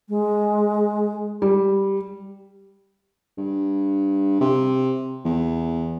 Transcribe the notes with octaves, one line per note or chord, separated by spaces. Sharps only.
G#3
G3
G2
C3
E2